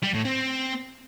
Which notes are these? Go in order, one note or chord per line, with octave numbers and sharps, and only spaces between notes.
G3
A2
C4